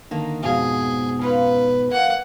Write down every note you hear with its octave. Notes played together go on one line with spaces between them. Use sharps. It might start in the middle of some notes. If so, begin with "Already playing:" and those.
D3 D#3 A#3
F2 G#2 B2 G#4 F5
C#4 D#4 F4 B4
F#2 E3 A#3 F#5